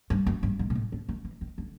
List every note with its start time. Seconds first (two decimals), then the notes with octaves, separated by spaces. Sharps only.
0.10 G2
0.27 F#2
0.43 G2
0.59 G#2
0.70 A#2
0.75 A2
0.92 D3
1.09 D#3
1.25 E3
1.41 D#3
1.58 D3